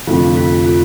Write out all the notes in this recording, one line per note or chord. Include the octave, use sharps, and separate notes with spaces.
F1 F2 D3 F4
F4
F4